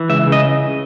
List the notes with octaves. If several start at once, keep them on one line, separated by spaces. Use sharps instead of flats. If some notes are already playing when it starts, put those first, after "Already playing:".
Already playing: E3
C#2 E5
C#3
D#5